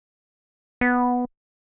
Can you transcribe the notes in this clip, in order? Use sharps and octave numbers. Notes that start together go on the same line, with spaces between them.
B3